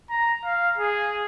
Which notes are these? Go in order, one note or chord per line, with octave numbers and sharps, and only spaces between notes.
A#5
F5
G#4